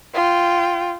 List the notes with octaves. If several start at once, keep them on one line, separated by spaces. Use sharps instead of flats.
F4 G5